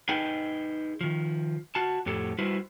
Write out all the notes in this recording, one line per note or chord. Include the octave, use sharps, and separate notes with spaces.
D#4 G#4 B4 D#5 G5
D#3 F3
F#4 A5
F2 A2 G4 A4
G3 E4 F#4 B4 C5